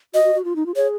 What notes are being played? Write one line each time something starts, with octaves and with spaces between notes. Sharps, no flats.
F#4 D#5
F#4
F#4
F4
D#4
F4
G#4 C#5